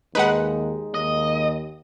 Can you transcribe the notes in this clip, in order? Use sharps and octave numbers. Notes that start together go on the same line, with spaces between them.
D#2 G#3 D#4 B4 F#5
D#2 D#5